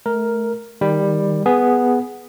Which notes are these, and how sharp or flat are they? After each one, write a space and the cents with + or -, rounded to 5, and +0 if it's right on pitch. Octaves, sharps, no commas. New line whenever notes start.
A3 -20 A#4 +0
D#3 +0 G3 +10
B3 +0 G#4 +0